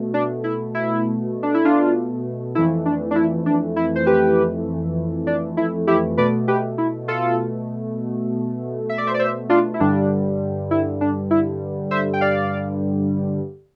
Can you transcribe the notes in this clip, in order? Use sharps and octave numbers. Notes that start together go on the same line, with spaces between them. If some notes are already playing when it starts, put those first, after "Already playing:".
Already playing: B2 A3
D4
E4
E4
D4
E4
D4 F4
F2 E3 A3 E4
D4
D4
E4
D4
E4
C5
G4 B4
D4
E4
E4 G4
B2 A3 B4 D5
G4 B4
E4
F4 A4
E5
D5
C5 E5
D5
C5 E5
D4 F4
E4
G2 D3 G3 D4
E4
D4
E4
C5 E5
G5
D5 F5